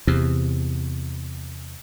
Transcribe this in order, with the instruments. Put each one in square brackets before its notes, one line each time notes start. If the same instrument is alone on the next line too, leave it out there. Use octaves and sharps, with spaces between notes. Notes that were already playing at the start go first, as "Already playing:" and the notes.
[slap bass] E2 C3